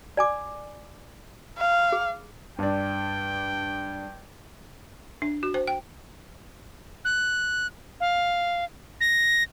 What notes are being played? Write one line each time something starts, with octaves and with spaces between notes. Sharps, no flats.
D5 G#5 D6
F5
G#4
G2 D4 G5
D4
F#4
C5
G5
F#6
F5
A#6